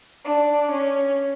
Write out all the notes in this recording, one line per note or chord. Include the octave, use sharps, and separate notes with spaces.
D4
C#4